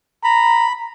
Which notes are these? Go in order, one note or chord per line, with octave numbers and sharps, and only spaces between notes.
A#5 B5